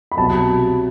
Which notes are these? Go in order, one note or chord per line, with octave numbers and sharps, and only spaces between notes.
B5
C2 B2 F#3 A5